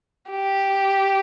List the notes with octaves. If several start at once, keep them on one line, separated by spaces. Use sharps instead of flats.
G4